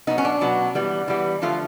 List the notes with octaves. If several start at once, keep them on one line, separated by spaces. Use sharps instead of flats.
B2 F#3 B3 D#4
C#4
D4
B2 F#3 B3
E3 G3 B3
E3 G3 B3
D3 F3 A3 F4